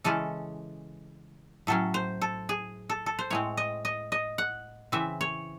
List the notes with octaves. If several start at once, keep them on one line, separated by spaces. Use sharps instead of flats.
C#3 E3 G#3 C#4 A4
A2 F#3 C#4 A4
C5
A4
G#4
A4
A4
C5
A2 G#3 C4 C#5
D#5
D#5
D#5
F#5
C#3 E3 C4 E5
C#5